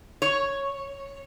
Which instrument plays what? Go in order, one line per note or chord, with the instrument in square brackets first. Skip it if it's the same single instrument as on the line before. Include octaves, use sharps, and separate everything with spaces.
[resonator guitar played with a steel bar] C#5